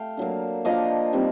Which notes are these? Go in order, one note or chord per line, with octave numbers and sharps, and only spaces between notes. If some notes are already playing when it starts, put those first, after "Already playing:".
Already playing: A3 F5 G5
D3 F#3 A#3
F3 A#3 D4 D#5 F5
D#3 G3 C4